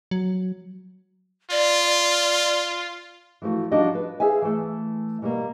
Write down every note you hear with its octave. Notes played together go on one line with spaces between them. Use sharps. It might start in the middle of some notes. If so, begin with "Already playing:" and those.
F#3
F4 D5
E3 F3 A3 F#4
F3 G3 D4 D#4 F#4 D#5
B4
G#4 C5 E5 F5 G#5
E3 A3
B2 G3 A#3